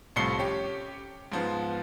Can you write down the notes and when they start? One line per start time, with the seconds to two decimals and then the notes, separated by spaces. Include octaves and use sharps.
0.16 C2 A2 F3 C7 C#7 G7
0.39 C#4 G4
1.32 G#2 F3 B3